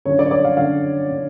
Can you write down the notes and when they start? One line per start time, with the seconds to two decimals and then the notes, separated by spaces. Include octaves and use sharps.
0.05 F#2 D3 C#5
0.19 D5
0.26 C#5
0.31 D5
0.45 F5
0.57 F#2 D3 F5
1.10 D3